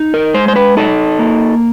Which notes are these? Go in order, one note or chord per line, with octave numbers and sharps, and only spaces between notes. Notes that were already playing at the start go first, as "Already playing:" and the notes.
Already playing: D#4
A#4
G#3 C5
C5
B4
D#4 A4
A#3